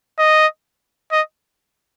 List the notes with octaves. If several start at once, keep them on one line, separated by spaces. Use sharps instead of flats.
D#5
D#5